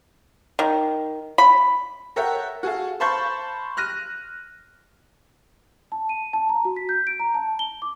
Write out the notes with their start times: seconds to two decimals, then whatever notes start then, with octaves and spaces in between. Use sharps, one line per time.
0.59 D#3
1.38 B5
2.16 A4 A#4 C#5 E5 F#5 G5
2.63 F#4 G#4 A4 F5
3.00 C5 F5 A5 B5 C#6 G6
3.77 F6 F#6 A#6 D#7
5.92 A5
6.09 D#7
6.33 A5
6.49 A#5
6.65 F#4
6.76 B6
6.89 G6
7.07 D7
7.20 A#5
7.35 A5
7.59 G7
7.82 D6